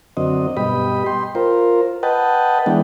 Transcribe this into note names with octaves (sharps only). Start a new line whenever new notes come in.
F#2 D3 C4 D#5
G2 B2 G4 D#5 B5
G5 C6
F4 A#4 C5
B4 D#5 F#5 G5 A5
E3 G#3 B3 D4